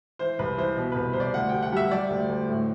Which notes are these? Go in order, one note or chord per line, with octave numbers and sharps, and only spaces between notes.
E3 C5
C2 B4
E3 C5
B2
C2 B4
C2 C5
D5
D2 F#5
G3 G5
F#5
G3 E5
G3 D5
D2
D2
A2